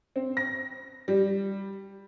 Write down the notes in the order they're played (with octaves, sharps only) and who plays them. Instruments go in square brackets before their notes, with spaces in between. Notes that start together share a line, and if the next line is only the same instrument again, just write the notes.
[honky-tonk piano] C4
A#6
G3